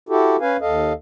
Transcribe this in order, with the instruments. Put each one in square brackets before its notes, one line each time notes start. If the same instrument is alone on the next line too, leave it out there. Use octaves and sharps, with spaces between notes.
[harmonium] E4 F#4 G4 A4
C#4 B4 F5 G#5
D#2 A4 D#5 F5